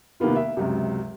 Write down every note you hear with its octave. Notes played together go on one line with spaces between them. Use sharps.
C3 D#3 A#3 B3 F4
E5
C#2 F#2 C3